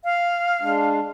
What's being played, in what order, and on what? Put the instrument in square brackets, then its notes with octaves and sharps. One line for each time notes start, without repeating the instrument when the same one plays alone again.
[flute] F5
[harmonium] G#3 D4